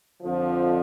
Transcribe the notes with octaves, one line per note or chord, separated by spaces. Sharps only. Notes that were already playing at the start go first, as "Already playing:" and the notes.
F2 D3 F3